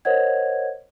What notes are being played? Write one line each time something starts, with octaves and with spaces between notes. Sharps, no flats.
A#4 C5 C#5 D#5 F#5 G#6